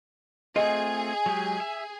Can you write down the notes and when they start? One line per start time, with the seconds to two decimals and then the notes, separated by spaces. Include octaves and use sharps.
0.56 A3 C4 F4 G#4 D#5
1.26 F#3 G#3 G4
1.60 E5